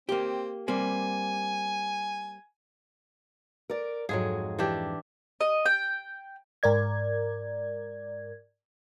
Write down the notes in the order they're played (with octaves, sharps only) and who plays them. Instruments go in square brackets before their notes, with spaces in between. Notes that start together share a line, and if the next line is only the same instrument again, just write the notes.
[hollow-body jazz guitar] A#3 G4 [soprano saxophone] C4
[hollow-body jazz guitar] G3 A#3 C4 [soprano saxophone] G#5
[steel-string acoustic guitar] A#4 D5
[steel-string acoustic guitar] F2 G#2 [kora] F#3 G#3 G#4
[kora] E3 D4 G4
[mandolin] D#5
G5
[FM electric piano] G#2 A#4 D5 G#6